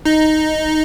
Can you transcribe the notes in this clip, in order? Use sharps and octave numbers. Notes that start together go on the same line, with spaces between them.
D#4